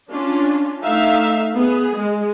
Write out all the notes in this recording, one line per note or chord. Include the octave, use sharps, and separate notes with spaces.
C#4 D4 F4
A3 D#4 E5 F5
B3 G#4
G#3